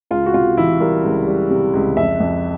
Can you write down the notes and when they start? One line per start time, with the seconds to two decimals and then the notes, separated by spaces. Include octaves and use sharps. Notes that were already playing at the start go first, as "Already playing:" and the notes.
0.11 C#2 F4
0.26 F#4
0.34 C3 F4
0.57 E3 E4
0.80 G3 A#4
1.04 C#2
1.27 G3
1.51 C3
1.74 C#2
1.97 F2 E5
2.20 F2